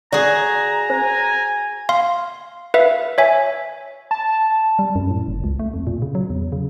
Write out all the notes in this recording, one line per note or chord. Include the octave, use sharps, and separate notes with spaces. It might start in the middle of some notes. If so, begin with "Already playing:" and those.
F#4 G#4 D5 A#5
C5 G#5
F5 C6
B4 E5 F5
C#5 E5 G#5
A5
G3
F#2
A2
F#1
C#2
A3
F2
A#2
C#3
F#3
E2
C#3